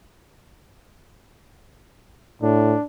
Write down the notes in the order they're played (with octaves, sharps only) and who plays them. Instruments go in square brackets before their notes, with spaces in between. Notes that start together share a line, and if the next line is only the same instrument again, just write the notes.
[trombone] A2 [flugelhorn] D4